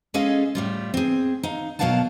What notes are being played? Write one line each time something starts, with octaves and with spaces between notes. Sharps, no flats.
G#3 C#4 G#4 A4 D#5 F5
A2 G3 F4
C4 G#4
D#4 F5
B2 F#3 A#4 F5 F#5 A5